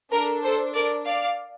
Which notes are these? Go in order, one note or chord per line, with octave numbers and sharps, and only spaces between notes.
D4 A4 A#4
A4 C5
A#4 D5
D5 F5